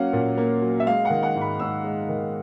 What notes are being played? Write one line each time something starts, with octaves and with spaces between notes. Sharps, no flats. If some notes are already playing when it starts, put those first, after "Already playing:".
Already playing: F#3 A#3 C#4 F5 F#5
A#2
A#3
F#3
E5
G#3 F5
F#5
D#3
F#5
G#2
B5
G#2 E6
G#3
D#3